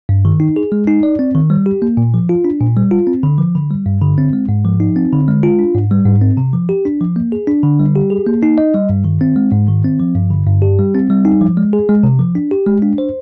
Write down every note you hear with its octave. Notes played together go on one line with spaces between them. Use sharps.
G2
D#3
D#4
G#4
G#3
D#4
D5
C4
D#3
G3
G4
A#3
A#2
F3
F4
D4
A#2
G3
F4
C4
D3
F3
D3
G3
G2
D3
C4
G#3
G#2
F3
D#4
C4
D3
G#3
F4
D4
G#2
G3
G#2
C4
C3
F3
G4
D4
F3
A#3
G#4
D4
D3
G3
G4
G#4
A#3
D#4
D#5
G3
G2
D#3
C4
G#3
G#2
D#3
C4
F3
G2
D3
G2
G4
G3
C4
G3
D#4
F3
G#3
G#4
G#3
C3
F3
D4
G4
G#3
D4
C5